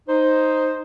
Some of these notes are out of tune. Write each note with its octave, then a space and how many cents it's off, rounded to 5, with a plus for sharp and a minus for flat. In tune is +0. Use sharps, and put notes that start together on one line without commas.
D#4 +0 C5 +0